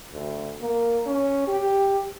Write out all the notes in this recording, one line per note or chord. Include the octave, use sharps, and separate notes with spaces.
D2
A#3
C#4
G4